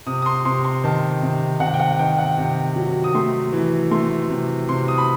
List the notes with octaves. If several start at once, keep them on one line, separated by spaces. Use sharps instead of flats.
C3 D#6
D#6
C6
C3 C6
C6
D#3 A5
C3
C3 F#5
G5
F#5
D#3 G5
F#5
C3
F#3
D#6
A3 C6
E3
A3 C6
C3
C3 C6
D#6
B5